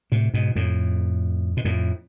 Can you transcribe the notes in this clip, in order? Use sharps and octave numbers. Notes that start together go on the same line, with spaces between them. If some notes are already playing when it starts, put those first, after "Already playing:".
A2 C3
G#2 B2
F2 A2
B2
F2 A2